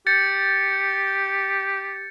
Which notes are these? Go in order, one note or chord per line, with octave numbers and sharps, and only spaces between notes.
G4 G6 A6 C#7